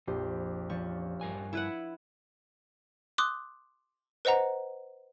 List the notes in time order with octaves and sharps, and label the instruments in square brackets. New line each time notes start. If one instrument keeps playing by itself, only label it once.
[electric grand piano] A#1 G4 [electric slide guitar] F2 [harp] C5
[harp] F3 C#4 D4 [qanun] C#6
[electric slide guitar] G2 A#4 G#5 [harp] F#6
[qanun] E4 B4 F#5 [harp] E5 G#6 D7
[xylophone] C6 D6 D#6 F#6
B4 C5 D#5 F#5 A#5